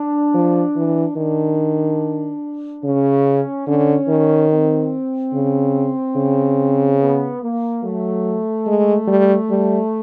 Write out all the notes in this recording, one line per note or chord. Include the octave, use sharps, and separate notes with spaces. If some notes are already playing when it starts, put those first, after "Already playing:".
Already playing: D4
F3
E3
D#3 D4
C#3 C#4
D3 C#4
D#3
C4
C#3
C#3
B3
A#3
F#3 A3
G#3
G3
G3